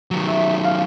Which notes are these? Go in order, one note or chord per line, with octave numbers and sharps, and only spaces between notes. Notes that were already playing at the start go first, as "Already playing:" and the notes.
D#3 F#3
E5
F5